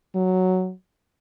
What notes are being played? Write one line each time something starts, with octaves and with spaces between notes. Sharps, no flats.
F#3